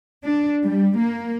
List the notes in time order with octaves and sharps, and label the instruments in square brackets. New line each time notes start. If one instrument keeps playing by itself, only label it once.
[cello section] D4
G3
A#3